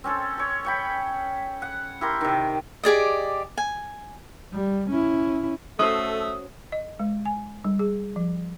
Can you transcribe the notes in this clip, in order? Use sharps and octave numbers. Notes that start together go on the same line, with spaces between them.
C4 C#4 A4
A4 C#5
C#5 G5 B5
F#5
E4 G4 A#4 C6
C3 D#3
G4 G#4 D5 D#5
G#5
G3
C#4 E4
A3 C#4 F#4 A4 C5 D#6
D#5
G#3
G#5
G3
G#4
F3